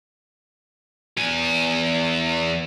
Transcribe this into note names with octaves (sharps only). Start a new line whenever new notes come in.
E2 G#5